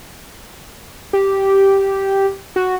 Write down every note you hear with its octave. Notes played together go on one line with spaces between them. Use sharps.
G4
F#4